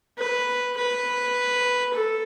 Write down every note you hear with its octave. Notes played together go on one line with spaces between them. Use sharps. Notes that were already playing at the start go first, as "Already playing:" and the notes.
B4
B4
A4